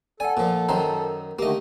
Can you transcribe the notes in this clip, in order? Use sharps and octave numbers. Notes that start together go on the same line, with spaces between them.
A4 D5 F#5 G#5
A#2 F3
F#2 D#3 C5 A#5
D3 D#3 A3 A#3 G4 D#5